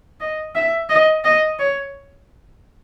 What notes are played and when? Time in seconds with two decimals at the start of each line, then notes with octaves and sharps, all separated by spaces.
0.20 D#5
0.55 E5
0.89 D#5
1.24 D#5
1.59 C#5